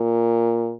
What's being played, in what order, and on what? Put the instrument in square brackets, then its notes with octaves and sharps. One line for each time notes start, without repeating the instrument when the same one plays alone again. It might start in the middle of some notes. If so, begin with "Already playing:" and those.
Already playing: [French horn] A#2